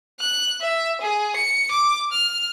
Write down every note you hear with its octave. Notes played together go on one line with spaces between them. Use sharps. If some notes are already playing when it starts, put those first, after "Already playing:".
F#6
E5
G#4
C#7
D6
F6